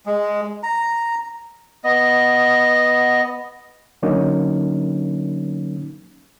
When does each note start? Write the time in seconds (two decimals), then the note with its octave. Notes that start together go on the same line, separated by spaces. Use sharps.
0.06 G#3
0.63 A#5
1.84 B3 D#5
4.02 D3 F#3 A#3 C#4 D#4